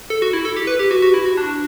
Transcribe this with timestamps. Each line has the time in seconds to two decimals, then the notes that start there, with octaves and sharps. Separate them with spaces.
0.10 A4
0.22 F#4
0.33 E4
0.45 A4
0.56 G4
0.67 B4
0.79 G4
0.91 F#4
1.02 F#4
1.14 E4
1.26 F#4
1.37 D4